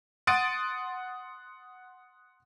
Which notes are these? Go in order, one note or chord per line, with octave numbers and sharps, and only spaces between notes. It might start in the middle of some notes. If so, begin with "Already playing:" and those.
F#5 C6 D#6 A6 D7 D#7